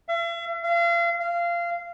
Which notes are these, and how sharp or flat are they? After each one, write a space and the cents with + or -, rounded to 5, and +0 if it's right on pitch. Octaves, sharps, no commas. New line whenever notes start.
E5 +45
F5 -35
F5 -20